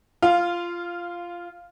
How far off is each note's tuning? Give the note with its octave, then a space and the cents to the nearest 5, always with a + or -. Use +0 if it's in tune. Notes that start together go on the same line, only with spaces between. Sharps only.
F4 -15 F5 +0